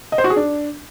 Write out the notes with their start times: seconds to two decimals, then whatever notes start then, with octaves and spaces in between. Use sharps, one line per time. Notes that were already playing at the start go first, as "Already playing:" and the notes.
0.12 D#5
0.18 C5
0.24 F#4
0.30 G#4
0.36 D4